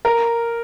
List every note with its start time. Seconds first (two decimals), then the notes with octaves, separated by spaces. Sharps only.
0.05 A#4